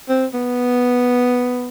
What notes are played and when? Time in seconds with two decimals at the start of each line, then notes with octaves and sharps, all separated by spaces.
0.09 C4
0.34 B3